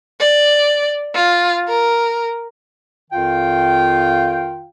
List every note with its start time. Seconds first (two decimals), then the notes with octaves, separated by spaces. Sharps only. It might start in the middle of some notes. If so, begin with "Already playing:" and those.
0.20 D5
1.14 F4
1.68 A#4
3.11 F2 D#3 F4 F5 G5